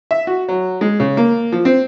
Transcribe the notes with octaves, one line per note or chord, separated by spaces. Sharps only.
E5
F#4
F#3
G#3
C#3
A#3
F3
C4